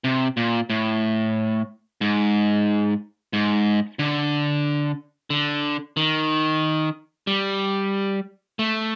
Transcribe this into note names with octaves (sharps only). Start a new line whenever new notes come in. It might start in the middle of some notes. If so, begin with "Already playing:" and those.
C3
A#2
A2
G#2
G#2
D3
D3
D#3
G3
A3